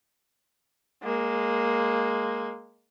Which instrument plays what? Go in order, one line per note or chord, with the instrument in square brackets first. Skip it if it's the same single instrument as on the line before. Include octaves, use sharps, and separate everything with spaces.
[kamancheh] G#3 A#3